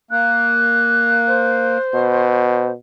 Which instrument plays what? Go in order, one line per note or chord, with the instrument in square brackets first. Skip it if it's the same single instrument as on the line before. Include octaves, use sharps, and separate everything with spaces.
[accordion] A#3 [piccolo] F#6
[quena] C5
[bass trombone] B2